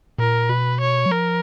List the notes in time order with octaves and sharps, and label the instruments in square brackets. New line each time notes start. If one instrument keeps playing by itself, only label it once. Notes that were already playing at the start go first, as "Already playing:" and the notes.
[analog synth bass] A#2 [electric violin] A#4
[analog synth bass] B2 [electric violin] B4
[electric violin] C#5
[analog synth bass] F#3
[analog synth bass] F3 [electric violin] A#4